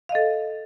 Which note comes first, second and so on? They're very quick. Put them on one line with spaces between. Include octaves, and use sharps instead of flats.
F5 D#5 A4